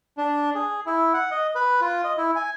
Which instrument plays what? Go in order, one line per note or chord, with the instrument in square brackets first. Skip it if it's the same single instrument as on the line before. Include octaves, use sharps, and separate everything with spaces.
[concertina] D4
G#4
E4
F#5
D#5
B4
F4
D#5
E4
G#5